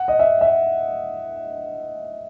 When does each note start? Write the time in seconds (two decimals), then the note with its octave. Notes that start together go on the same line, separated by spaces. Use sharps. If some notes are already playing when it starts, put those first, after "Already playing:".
Already playing: F#5
0.08 D#5
0.19 E5
0.41 E5